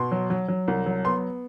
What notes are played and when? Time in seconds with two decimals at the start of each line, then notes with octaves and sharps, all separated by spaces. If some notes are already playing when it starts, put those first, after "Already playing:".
Already playing: B2 C6
0.12 F#3
0.30 F#3
0.48 F#3
0.68 C2
0.86 F#3
1.04 B3 C6